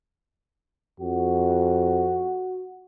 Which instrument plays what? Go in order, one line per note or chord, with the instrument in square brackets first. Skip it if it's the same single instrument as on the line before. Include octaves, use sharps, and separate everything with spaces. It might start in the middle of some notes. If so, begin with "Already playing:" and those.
[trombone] F2 [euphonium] F#4